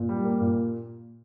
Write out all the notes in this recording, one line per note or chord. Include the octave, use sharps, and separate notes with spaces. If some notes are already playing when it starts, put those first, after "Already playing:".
Already playing: A#2
G3
A#3
A#2